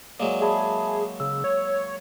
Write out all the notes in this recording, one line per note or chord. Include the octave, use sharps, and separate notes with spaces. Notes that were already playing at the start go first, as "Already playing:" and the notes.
F#3 G#3 A#3 D5
G#4 E5 A5 B5
C#3 E6
C#5